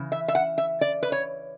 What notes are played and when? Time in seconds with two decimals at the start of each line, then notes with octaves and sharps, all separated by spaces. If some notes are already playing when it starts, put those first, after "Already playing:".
Already playing: C#3 E3
0.12 E5
0.28 E5
0.35 F#5
0.58 E5
0.81 D5
1.03 B4
1.12 C#5